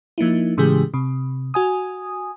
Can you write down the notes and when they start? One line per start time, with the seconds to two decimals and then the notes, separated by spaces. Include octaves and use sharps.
0.18 F3 A#3 D#4 E4
0.57 A2 C#3 E3 G#3 G4 G#4
0.94 C3
1.54 F#4 G#5 D#6